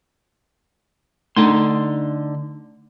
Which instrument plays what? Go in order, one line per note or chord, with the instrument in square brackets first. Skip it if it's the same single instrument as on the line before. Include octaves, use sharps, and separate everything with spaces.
[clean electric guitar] D3 D#4 C6 [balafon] A3 D4